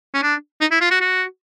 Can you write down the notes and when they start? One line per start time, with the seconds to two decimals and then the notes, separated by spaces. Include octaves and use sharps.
0.14 C#4
0.23 D4
0.61 D#4
0.71 E4
0.81 F4
0.91 F#4
1.01 F#4